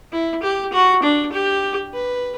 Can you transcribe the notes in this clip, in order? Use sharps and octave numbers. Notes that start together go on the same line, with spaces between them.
E4
G4
F#4
D4
G4
B4